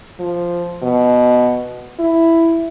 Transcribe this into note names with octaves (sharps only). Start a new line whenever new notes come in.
F3
B2
E4